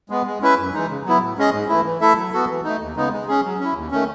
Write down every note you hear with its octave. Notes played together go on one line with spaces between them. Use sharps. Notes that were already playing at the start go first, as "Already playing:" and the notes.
G#3 B3
G#3
C#4 E4 B4 E5
F#2
E3 G#3 D#4
C#3
F#3 B3 E4
A2
G#3 C#4 G#4 D#5
G#2
E3 A3 E4
E3
A3 E4 A4 E5
F#3
B3 F#4 A4
E3
A3 D#4
D#2
C#3 G#3 B3 D#4
G#3
C#4 G#4
F#3
C#4 E4
D#2
D#3 A3 C#4